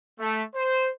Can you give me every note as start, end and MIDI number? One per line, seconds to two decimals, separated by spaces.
0.20 0.43 57
0.55 0.89 72